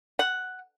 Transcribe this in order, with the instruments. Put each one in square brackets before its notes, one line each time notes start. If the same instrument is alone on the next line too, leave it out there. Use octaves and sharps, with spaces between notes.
[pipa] F#5